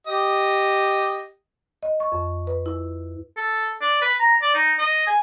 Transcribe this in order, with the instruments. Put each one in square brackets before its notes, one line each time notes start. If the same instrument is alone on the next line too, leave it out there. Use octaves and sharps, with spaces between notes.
[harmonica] G4 D#5
[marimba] D#5
C#6
F2
B4
E4
[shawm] A4
D5
B4
A#5
D5
D#4
D#5
G#5